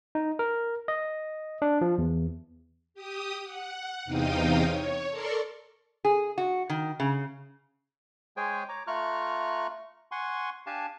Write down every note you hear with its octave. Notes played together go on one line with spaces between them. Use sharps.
D#4
A#4
D#5
D4
F3
E2
G4 D#6
F#5
E2 C3 D#4 F5 G5 D#6
C#5
A4 A#4 D5 C6 C#6
G#4
F#4
D#3
C#3
G#3 G#4 C5 C#5 G5 G#5
C#5 A#5 D6
A3 F4 A#5 C#6 F6 F#6
F#5 G#5 C6 C#6
D4 G4 F5 G#5 A5